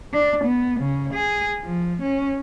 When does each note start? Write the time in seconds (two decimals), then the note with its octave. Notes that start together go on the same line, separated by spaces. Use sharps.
0.14 D4
0.45 B3
0.80 C#3
1.13 G#4
1.65 F3
2.02 C#4